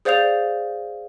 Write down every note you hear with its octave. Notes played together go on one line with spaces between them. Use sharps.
G#4 C5 D5 F5 G6 F7